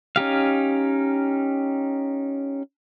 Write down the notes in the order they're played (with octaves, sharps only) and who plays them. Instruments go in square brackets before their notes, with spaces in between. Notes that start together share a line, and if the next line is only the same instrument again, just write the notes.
[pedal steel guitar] C#4 D#4 G4 F5